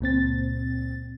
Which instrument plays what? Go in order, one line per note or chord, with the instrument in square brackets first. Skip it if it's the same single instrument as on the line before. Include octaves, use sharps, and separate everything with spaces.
[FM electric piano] C#2 A#2 C4 A6